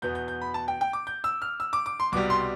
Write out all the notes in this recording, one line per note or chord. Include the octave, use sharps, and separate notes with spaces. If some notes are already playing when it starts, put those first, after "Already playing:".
E2 B2 B3 G6
G6
G6
B5
A5
G5
G5
D6
G6
E6
F6
E6
D6
D6
C6
C2 B2 G3 D6
C6